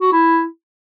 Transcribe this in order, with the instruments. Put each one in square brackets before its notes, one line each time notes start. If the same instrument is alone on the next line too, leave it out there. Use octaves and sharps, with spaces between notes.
[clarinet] F#4
E4